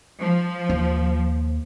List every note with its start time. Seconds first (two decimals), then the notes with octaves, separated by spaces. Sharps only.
0.21 F3
0.70 D#2